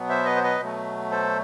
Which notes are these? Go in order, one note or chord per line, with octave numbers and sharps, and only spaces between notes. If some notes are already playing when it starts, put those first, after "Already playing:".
Already playing: B2 F#3 B3
C5 E5
B4 D#5
C5
B4 D#5
B2 F#3 A3
A4 C5